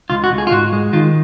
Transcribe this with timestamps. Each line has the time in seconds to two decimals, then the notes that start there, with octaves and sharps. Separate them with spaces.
0.10 C#2 F4
0.24 F#4
0.31 C#2
0.38 G#4
0.47 F4
0.52 G#2 F#4
0.73 G#3
0.93 D#3 F4